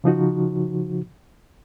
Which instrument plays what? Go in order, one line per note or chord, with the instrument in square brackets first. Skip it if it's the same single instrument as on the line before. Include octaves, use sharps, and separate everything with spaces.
[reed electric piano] C#3 F3 D#4 F#4